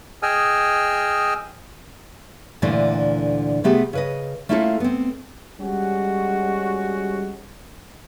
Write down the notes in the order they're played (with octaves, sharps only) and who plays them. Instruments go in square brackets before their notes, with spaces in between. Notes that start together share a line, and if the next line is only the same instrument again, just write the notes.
[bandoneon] G#4 D#5 G5 G#5 E6 F6
[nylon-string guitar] D2 A#2 D3 E3 A3 A#3
C3 A3 B3 G4 G#4
C#3 B4 D#5
A3 A#3 C#4 E4 F4 A4
B3 C4
[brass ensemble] G3 G#3 C#4 F#4